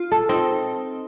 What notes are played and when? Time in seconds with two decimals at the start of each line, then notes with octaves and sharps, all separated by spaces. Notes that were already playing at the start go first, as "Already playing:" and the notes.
Already playing: F4
0.12 A4
0.29 C4 D#4